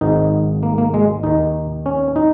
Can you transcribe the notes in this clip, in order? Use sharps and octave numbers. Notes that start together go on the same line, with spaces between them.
G#1 G#2 D#3 D#4
A#3
A#3
G#3
D#2 D#3 D#4
C#4
D#4